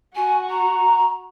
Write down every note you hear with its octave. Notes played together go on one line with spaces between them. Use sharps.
F#4 G#5
A#5